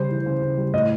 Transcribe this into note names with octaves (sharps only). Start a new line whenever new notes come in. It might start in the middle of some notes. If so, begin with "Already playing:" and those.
Already playing: C#3 G3 C5
E3
C#3
C#3
G3
A2 D#5